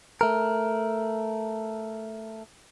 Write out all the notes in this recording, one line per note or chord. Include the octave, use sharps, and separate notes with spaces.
A3 A#4